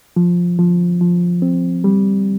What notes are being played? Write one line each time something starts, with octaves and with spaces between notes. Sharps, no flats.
F3
F3
F3
C4
G3